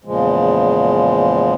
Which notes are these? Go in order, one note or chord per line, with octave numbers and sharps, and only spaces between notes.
E2 A#2 C#3 F3 G#3